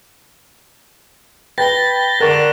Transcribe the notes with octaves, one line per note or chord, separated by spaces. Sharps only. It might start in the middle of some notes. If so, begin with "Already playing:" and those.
B4 G5 B5 A6 A#6 G7
D3 A#4 C#6